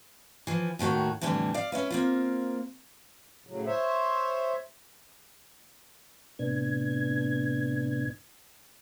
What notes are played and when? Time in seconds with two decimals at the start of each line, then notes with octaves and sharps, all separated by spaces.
0.47 E3 F3
0.79 D#2 A2 D#3 F#4
1.21 F2 A2 D3 E3 G3
1.54 D5 F5
1.72 C#4 E4 B4
1.91 A#3 C4 F4
3.47 A2 C#3 F#3
3.66 C5 C#5 E5
6.39 A2 C3 B3 D4 G#6